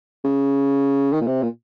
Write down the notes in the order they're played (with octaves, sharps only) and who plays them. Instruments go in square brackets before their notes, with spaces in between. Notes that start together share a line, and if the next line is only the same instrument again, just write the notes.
[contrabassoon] C#3
D#3
A#2
C3
A#2